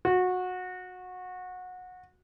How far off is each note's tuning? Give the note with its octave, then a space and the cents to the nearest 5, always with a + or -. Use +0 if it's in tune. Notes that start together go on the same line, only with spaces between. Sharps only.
F#4 -20